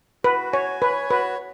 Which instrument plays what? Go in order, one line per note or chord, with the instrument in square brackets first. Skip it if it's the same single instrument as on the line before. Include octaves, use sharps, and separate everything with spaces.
[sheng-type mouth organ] F#4 [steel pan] B4
[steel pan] C#5 [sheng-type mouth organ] G#5
[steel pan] B4 [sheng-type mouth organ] C#5
[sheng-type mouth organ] F#4 [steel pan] B4